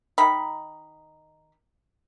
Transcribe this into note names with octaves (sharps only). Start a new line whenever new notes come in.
D#3 D#4 B5